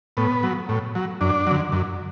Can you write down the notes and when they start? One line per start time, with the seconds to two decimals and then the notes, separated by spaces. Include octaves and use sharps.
0.17 A2 B3
0.43 F#3
0.69 A2
0.95 F#3
1.21 F#2 D4
1.47 D3 F#3
1.72 F#2